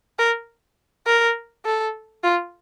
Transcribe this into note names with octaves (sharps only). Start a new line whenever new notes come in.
A#4
A#4
A4
F4